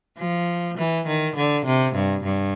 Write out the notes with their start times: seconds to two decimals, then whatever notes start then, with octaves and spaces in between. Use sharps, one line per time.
0.18 F3
0.77 E3
1.07 D#3
1.36 D3
1.66 C3
1.94 G2
2.23 G2